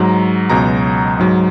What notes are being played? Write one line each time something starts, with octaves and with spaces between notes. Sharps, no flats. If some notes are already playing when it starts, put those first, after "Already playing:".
Already playing: G#2 F#3 A#5
C#2 B2 F#3 A#5
G#2 F#3